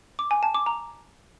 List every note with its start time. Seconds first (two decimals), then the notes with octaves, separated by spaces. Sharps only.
0.19 D6
0.31 G#5
0.43 A5
0.55 D6
0.66 A#5